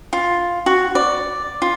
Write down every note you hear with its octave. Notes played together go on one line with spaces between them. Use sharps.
F4
F#4
D5
F4